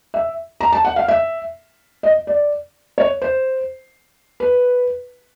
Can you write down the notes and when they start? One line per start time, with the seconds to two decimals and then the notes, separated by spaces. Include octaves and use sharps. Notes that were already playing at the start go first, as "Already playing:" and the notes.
0.14 E5
0.61 A#5
0.73 A5
0.85 F#5
0.96 F5
1.08 E5
2.03 D#5
2.27 D5
2.98 C#5
3.22 C5
4.40 B4